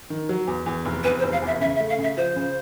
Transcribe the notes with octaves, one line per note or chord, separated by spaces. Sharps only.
D#3
F#3
E2
E2
F1
E2 B4
C5
F1
F5
E2 E5
C#3 E5
E5
A3
F5
C#3 E5
F3 C5
C#3